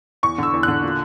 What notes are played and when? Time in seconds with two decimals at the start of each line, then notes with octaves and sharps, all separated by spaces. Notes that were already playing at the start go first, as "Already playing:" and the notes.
0.23 E2 C#6
0.38 D3 E6
0.53 E2
0.63 D3 F#6
0.83 A#2